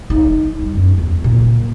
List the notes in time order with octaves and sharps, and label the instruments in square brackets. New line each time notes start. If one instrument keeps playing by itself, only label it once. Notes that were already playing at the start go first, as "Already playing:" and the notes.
[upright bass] D#4
G3
F#2
E2
A#2